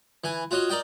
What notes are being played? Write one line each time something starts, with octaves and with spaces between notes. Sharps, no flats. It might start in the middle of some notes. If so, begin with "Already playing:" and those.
E3 G#5
F4 F#4 C#5 D#5
A#4 D5 D#5 G5